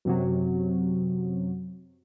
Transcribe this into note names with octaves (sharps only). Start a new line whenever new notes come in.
F#2 C3 F#3